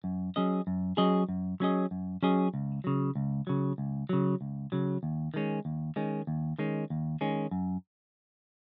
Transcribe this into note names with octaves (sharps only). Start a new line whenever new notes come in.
F#2
F#3 C#4 G#4 D#5
F#2
F#3 C#4 G#4 D#5
F#2
F#3 C#4 G#4 D#5
F#2
F#3 C#4 G#4 D#5
C#2
C#3 F#3
C#2
C#3 F#3
C#2
C#3 F#3
C#2
C#3 F#3
D#2
D#3 G#3 C#4
D#2
D#3 G#3 C#4
D#2
D#3 G#3 C#4
D#2
D#3 G#3 C#4
F#2